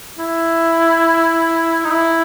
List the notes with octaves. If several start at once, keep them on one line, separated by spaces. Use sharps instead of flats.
E4
D#4
E4